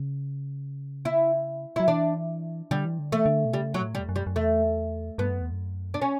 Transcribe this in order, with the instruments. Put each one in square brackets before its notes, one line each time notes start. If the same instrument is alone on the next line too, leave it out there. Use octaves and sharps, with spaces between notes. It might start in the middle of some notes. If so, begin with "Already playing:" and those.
Already playing: [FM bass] C#3
[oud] E4
[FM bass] F#3 [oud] E4
[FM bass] E3 [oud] D4
[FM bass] D3 [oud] G3
[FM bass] E3
D3
[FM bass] E3 [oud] A3
[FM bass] D3
B2
[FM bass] C#3 [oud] G3
[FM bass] B2 [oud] F#3
[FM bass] A2
[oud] G3
[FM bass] E2
F#2
[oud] G3
[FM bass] F#2
[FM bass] E2 [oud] A3
[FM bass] G2 [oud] B3
[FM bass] F#2
E2
F#2
[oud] D4
C#4